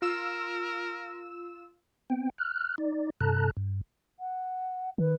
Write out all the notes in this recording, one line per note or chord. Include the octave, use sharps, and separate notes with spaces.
F4 A#4 E6 E7
B3 C4 G5
F6 F#6
D#4 D5
G2 C3 A4 A5 A#5 F#6
G2
F#5
D#3 B4